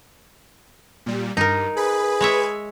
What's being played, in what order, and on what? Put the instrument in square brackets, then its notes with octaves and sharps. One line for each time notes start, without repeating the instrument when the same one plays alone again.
[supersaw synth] A#2 G3
[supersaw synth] G2 [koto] D#4 A#4
[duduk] G#4 [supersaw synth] B4 B5
[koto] G#3 C#5 E5